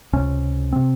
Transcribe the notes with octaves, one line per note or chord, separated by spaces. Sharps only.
C#2 C3 C#4
C3 C4